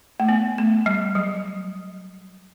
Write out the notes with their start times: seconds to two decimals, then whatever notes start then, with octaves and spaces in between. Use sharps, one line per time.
0.20 A3
0.29 B3
0.58 A3
0.86 G3
1.15 F#3